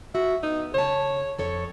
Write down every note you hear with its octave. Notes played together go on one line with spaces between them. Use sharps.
F#4 E5
B3 D#4
C#3 C#5 A5
F2 A4 C#5